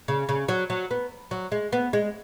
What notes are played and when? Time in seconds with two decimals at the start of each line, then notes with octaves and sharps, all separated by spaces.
0.08 C#3
0.29 C#3
0.48 F#3
0.70 F#3
0.91 B3
1.31 F#3
1.52 G#3
1.73 B3
1.93 G#3